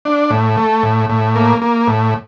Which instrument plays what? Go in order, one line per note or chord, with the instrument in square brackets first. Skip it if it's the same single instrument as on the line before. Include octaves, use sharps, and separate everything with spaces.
[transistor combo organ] D4
A2
A3
A2
A2
A#3
A#3
A2